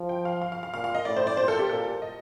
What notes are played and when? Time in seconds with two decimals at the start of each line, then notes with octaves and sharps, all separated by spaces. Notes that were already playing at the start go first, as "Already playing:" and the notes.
Already playing: F3
0.09 G5
0.25 F5
0.42 F5
0.52 F5
0.63 F5
0.73 A#2 F5
0.84 F5
0.95 D#5
1.05 A2 D5
1.16 C5
1.27 D5
1.37 A#2 C5
1.48 A4
1.59 G4
1.69 A#2 A4
2.02 D#5